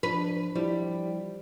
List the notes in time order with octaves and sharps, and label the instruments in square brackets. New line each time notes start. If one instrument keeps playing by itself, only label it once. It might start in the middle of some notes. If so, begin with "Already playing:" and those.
[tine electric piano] F3 D4 [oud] B4
[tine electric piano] F3 E4 [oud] G3